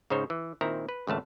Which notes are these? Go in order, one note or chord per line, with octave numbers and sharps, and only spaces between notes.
G#2 C#3 D#4 C5 C#5
E3
A#2 D#3 C4 E4 A#5
B4
G#1 C#2 A3 A5